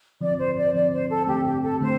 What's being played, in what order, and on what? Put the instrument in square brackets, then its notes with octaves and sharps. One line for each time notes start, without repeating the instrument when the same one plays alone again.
[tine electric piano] D3 F3 C4 [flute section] D5
[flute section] C5
D5
[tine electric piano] D3 F3 C4 [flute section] D5
[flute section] C5
A4
[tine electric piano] D3 A3 C4 [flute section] G4
[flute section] G4
A4
[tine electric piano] D3 A3 [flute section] C5